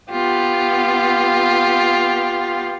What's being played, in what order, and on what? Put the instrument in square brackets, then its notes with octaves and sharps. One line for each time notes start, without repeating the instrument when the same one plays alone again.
[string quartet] B3 F4 G4